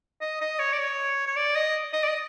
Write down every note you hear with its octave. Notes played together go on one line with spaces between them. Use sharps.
D#5
D#5
C#5
D5
C#5
C#5
D5
D#5
D#5
D5
D#5